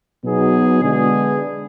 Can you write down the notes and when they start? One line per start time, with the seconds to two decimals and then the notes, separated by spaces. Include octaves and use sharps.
0.25 B2 F#3 B3 D#4 G#4
0.83 D3 G#3 B3 D4 G#4